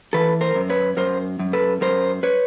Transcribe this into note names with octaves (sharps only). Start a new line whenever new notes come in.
E3 A4 B4
A#4 C5
F#2
B4 C#5
F#2 A#4 C5
F#2
A4 B4
F#2 A#4 C5
B4 C#5